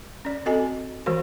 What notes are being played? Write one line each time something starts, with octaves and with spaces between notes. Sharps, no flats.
C#4 D5
C4 F#4 A4 D#5 G#5
E3 G#3 F#4 A#4 C5